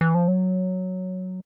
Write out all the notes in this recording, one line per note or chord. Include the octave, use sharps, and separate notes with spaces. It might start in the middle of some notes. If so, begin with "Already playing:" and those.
E3
F3
F#3